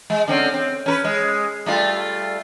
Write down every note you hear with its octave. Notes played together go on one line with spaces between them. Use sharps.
G#3
D3 C4 C#4
C4
C#4 A#4 B4
G#3
G3 A3 F4